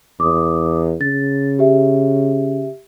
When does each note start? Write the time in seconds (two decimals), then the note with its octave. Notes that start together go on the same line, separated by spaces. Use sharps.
0.20 E2 D6 D#6
1.01 C#3 A6
1.59 G4 E5